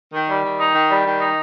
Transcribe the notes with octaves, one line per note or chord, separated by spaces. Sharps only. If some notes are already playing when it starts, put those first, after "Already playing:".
D#3
G3
D#3
D#4
D#3
G3
D#3
D#4